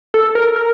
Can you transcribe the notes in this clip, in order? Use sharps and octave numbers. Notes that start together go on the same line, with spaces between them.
A4
A#4
A#4